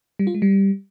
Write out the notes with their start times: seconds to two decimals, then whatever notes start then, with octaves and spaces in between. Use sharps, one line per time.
0.19 G3
0.27 F4
0.34 G#3
0.42 G3